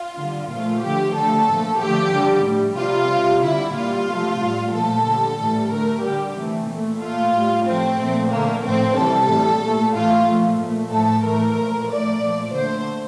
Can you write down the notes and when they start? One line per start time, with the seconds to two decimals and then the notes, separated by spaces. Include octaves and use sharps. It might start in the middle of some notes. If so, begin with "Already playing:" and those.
Already playing: F4
0.18 D3 G3
0.50 A#2 F3 A3 F4
0.83 D3 F3 A3 G4
1.16 D3 A3 A4
1.48 A#2 F3 A3
1.81 D3 F3 A3 G4
2.14 D3 G3
2.46 A2 G3
2.78 C3 G3 F4
3.10 C3 G3
3.44 D3 G3 E4
3.76 A#2 G3 F4
4.09 C3 F3 A3
4.41 A2 G3
4.74 A#2 F3 A3 A4
5.06 D3 G3
5.39 A2 E3 G3
5.71 D3 A3 A#4
6.04 D3 G3 G4
6.37 C3 E3 A3
6.69 A#2 A3
7.01 A#2 A3 F4
7.34 A2 G3
7.66 A2 F3 A3 C4
7.99 A#2 F3 A3
8.31 D3 A3 A#3
8.64 A2 F3 A3 C4
8.97 C3 E3 G3 A4
9.29 A2 E3 G3
9.62 A#2 A3
9.94 A2 E3 A3 F4
10.27 A#2 F3 A3
10.59 A#2 A3
10.92 A2 F3 A3 A4
11.25 A2 E3 A3 A#4
11.58 A#2 F3 A3
11.90 A2 F3 A3 D5
12.22 A#2 F3 A3
12.55 D3 A3 C5